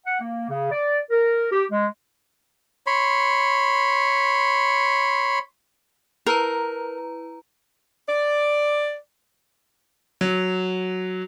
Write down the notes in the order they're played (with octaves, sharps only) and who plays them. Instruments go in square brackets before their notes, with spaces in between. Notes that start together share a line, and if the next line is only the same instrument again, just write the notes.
[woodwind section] F#5
A#3
C#3
D5
A#4
G4
G#3
[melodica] C#5 B5 C6
[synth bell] E4 B4 A#5 [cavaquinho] A#4
[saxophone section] D5
[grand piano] F#3